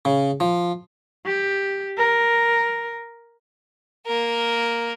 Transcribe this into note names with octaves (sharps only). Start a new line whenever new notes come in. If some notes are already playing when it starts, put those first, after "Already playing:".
C#3
F3
G4
A#4
A#3 A#4